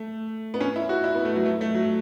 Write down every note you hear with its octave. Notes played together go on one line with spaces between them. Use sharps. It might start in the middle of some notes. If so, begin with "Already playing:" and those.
Already playing: A3
B3
C#4
E4
F#4
E4
B3
A3
F#3
A3
A3
F#3